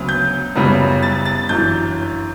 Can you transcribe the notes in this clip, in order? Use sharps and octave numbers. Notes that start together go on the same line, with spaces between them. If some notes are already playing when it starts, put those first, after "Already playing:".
Already playing: D2 C#3 F#3 B3
G6
F#1 F#2 C#3 G3 B3
A6
A6
G1 F#2 E3 G6